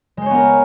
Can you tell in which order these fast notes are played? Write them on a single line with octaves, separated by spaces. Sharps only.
G#3 C5 C#5 B3 A#4